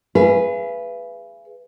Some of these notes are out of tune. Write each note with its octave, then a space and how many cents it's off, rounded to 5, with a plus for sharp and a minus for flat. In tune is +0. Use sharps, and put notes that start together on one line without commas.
G#4 +0 B4 +0 F5 -45